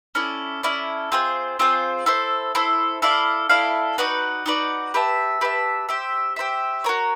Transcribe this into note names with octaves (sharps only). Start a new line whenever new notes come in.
C#4 E4 A4 D5
C#4 E4 A4 D5
C4 F4 G#4 C5
C4 F4 G#4 C5
E4 A4 C5
E4 A4 C5
E4 A4 D5 F5
E4 A4 D5 F5
D#4 F#4 B4 D5
D#4 F#4 B4 D5
G4 B4 E5 A5
G4 B4 E5 A5
G4 C5 E5
G4 C5 E5
F#4 A#4 C#5